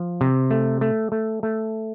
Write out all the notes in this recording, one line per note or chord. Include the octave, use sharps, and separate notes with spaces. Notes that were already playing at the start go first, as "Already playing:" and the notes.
Already playing: F3
C3
A3
A3
A3
A3